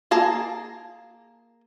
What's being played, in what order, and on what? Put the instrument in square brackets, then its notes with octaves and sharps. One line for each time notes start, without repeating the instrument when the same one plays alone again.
[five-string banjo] A#3 G#4 A5 A#5